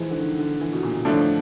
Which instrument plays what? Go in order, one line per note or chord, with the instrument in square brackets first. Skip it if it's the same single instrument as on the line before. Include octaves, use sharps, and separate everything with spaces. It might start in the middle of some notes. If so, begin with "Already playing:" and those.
Already playing: [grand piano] E3 F3 G#3
D3
D#3
D3
E3
B2
A#2
[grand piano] A2 [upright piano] D3 F3 A3 D4